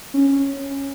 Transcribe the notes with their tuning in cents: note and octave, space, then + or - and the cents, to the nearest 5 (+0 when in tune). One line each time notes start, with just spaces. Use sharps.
C#4 -10